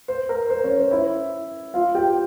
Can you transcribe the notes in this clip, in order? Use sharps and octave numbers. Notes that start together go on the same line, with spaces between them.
C5
A#4
C5
C#4 C#5
C5
E4 E5
F4 F5
G4 G5